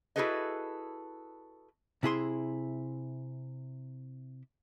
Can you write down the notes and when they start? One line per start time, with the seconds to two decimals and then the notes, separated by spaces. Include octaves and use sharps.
0.16 E4 F#4 G#4 A4 B4 D#5
2.03 C3 E4 G#4 C6